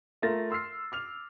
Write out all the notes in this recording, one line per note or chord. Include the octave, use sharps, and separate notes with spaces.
A3 F4 A#4 A6 A#6
C6 E6 F6 C7
D6 F6 F7